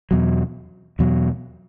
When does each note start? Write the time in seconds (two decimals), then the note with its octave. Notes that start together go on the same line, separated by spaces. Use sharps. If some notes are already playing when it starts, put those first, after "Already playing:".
0.11 E2 B2 F#3
0.99 E2 B2 F#3